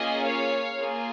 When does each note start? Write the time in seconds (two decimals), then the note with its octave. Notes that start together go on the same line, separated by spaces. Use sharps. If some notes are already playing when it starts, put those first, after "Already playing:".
Already playing: A#3 C#4 F4 G#4 D#5 G#5
0.25 C#5 F5
0.79 A#3 F4 G#4